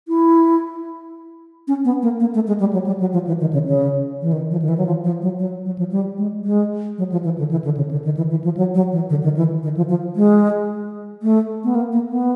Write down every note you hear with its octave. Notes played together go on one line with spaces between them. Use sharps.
E4
C#4
B3
A#3
A#3
A3
G#3
G3
F#3
G3
F#3
F3
E3
D#3
C#3
C#3
E3
D#3
F3
D#3
E3
F#3
F3
F3
F#3
F#3
F#3
F3
G3
G#3
G#3
F#3
F3
E3
D3
E3
D3
C#3
D3
D#3
E3
E3
F3
F#3
F#3
E3
D3
D#3
E3
D#3
F3
F3
G#3
A3
B3
A#3
A#3
B3